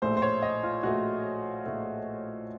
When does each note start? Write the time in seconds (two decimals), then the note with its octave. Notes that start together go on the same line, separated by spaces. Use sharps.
0.02 A#1 A2 A3 C5
0.17 C5
0.22 C#5
0.42 D#5
0.63 F4
0.83 A#1 A2 A3 F#4
1.66 A#1 A2 A3